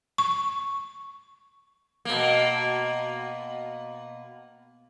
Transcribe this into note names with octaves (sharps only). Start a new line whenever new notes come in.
C#6
B2 A#3